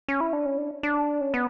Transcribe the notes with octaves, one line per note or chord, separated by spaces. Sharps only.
C#4
E4
D4
C#4
D4
D4
C#4
B3